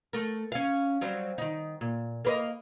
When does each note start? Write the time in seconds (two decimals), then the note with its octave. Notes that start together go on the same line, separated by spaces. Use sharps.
0.13 A3 A#4
0.52 C#4 F5
1.01 F#3 G3 C4
1.38 D#3 D#4
1.81 A#2
2.25 A#3 B4 D#5